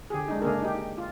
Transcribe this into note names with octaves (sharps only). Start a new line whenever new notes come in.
D3 G4 G#4
G#3 D4 D#4
C#3 A3 A#3 D4 G#4 A#4
D#4 G4
F4